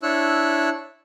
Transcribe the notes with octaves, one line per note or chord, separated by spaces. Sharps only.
D4 E4 C#5 E6 F#6